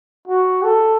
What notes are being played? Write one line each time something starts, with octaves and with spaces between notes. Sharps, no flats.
F#4
A4